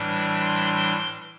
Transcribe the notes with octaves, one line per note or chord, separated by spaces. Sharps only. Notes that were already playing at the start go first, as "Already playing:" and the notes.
Already playing: A2 E3 G3 D4
C6